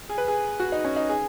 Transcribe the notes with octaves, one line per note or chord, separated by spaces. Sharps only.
G#4
B4
G#4
F#4
D#4
C#4
D#4
G#4